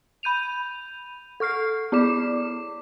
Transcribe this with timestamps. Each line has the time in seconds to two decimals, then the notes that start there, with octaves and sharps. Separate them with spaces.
0.23 B5 G6 D#7 F7
1.40 A4 C#6 F6 C7
1.92 B3 E4 D5 D6 E7